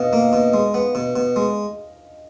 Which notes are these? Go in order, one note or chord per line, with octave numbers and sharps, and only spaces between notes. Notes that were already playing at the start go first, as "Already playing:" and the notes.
Already playing: B2 D#5 F5
A#3
B2
G#3
B3
B2
B2
G#3